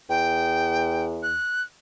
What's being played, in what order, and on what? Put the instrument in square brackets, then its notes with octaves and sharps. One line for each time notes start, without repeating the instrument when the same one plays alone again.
[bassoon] E2 [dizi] G5
[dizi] F#6